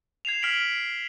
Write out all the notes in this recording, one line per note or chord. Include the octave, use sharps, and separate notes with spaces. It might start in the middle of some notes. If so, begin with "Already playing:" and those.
G#6 C7 E7 F7
F6 B6 D7 F#7